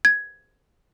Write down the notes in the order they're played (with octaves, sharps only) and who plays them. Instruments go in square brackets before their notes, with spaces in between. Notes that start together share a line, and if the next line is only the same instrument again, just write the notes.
[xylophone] G#6